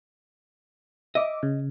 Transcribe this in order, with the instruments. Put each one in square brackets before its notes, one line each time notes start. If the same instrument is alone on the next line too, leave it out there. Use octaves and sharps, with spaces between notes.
[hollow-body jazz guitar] D#5 [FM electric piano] E5 D6
[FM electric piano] C#3